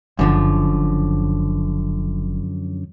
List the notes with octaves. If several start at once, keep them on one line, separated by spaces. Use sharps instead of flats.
F#1 F#2 D3 F3